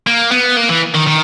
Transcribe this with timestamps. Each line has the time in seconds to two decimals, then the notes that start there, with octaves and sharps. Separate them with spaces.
0.07 A#3
0.31 B3
0.57 A#3
0.69 E3
0.95 D#3
1.07 D#3